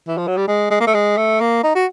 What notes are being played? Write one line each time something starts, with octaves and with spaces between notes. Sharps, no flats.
E3
F3
F#3
G3
G#3
G#3
A#3
A3
G#3
A3
A#3
D#4
F#4